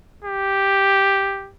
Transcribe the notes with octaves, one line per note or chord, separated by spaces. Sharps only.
G4